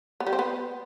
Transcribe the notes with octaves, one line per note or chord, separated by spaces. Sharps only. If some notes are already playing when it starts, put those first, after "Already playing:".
B3
G3
C4
B3